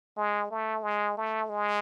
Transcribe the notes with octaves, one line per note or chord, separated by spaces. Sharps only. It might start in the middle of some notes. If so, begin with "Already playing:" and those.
G#3
A3
G#3
A3
G#3